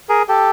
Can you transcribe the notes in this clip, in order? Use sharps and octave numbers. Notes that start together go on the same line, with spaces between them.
G#4 A#4
G4 A4